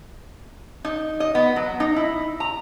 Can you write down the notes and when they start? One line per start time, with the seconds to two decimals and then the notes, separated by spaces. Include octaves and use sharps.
0.85 D#4
1.20 D#5
1.35 B3
1.56 F#3
1.80 D#4
1.96 E4
2.40 A#5